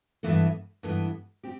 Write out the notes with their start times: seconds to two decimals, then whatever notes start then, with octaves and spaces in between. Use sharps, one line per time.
0.23 G2 E3 B3 E4 A4
0.83 G2 E3 B3 E4 A4
1.44 C4 G4